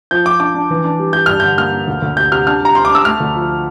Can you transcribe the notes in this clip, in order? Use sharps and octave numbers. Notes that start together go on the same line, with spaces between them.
F3 G6
F3 D6
D4 D6
D4
E3
D4
G3
G3 G6
G2 F6
D3 G6
A#3 F6
A#3
D2
D2
C3 G6
C3 F6
D4 F6
G3 A#5
C3 C6
D6
D4 E6
A3 F6
D2
F3